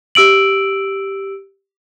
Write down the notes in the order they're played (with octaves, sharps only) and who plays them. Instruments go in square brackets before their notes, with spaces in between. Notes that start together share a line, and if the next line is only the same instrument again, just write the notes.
[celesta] G4 E6 D7 F#7